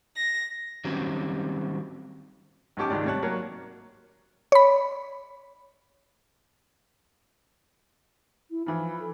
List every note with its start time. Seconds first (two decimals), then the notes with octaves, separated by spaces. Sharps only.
0.15 A#6
0.84 D#3 F#3 G3 C4 C#4 F#4
2.77 B1 G#2 C#4 G4 A5 D6
2.90 C#2 G#2 D#3 D5
3.05 C3 G3 C#5 A5 F#6
3.22 F#3 A#3 A#4 C#5
4.52 C#5 B5
8.50 E4
8.66 E3 F3 B5
8.99 A4